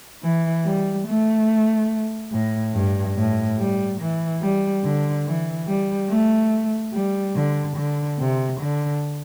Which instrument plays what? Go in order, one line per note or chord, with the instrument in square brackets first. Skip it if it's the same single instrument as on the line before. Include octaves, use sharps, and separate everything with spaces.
[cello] E3
G3
A3
A2
G2
A2
G3
E3
G3
D3
E3
G3
A3
G3
D3
D3
C3
D3